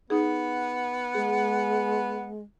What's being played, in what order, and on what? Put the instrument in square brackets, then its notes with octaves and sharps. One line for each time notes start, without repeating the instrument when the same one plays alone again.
[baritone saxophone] B3 [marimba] D#4 G#4 [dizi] F#5
[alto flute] G#3 [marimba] G#4